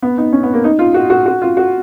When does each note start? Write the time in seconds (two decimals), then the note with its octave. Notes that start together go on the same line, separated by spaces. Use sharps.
0.02 B3
0.18 D#4
0.33 C#4
0.43 B3
0.54 A#3
0.64 D#4
0.79 F4
0.94 F#4
1.10 F#4
1.26 F#4
1.42 F4
1.57 F#4